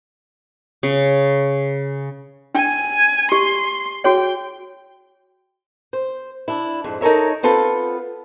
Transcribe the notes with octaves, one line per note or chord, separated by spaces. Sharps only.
C#3
D4 G5 G#5
G4 C6
F#4 G#4 C#5 G5
C5
D4 E4
F2 G#2
D#4 A4 A#4 C#5 E5
B3 C4 F4 A4 B4